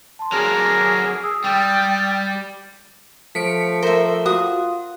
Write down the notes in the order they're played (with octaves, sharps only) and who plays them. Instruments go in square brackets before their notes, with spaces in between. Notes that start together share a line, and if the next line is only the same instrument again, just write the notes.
[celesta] A5 C6
[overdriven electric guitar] F#3 D4 [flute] G#4 [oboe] A#4 [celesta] F7
[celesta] D#6 E6
[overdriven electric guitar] G3 [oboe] D5 [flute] G5
[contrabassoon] F3 [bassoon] A3 [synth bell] B6 C#7 D7
[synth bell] A#4 [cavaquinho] C5 E5
[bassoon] F4 [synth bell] F#4 [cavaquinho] D#6